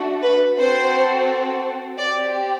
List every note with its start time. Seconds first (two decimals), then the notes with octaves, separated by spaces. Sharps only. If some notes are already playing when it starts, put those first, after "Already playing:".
Already playing: A3 D4 F#4
0.22 B4
0.58 C4 F#4 A4 C5
1.98 C4 G4 D5